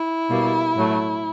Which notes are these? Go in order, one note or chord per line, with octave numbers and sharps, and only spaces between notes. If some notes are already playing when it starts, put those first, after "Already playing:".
Already playing: E4
B2 G3 A#3
A2 F#3 A3